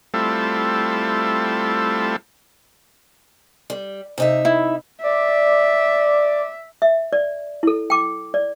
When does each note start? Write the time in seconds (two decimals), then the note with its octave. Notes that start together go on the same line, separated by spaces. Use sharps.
0.14 G3 A3 C4 E4 F4 A4
3.70 G3
4.18 C3 D#4 E5
4.45 E4
5.03 D5 E5
6.82 E5
7.13 D5
7.63 E4 A4
7.90 G5 D6
8.34 D5